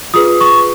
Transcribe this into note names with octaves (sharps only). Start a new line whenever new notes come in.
F4 G#4 B4 D#6
C#6